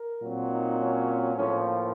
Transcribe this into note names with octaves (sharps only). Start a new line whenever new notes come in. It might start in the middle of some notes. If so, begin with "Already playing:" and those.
Already playing: A#4
A#2 F#3 C4
D#4
C#4
A2 F3 A#3 C#4